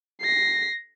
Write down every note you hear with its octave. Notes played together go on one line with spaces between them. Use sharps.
A#6 C7